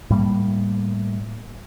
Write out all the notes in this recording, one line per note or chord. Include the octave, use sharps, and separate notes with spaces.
A2 G3 A#3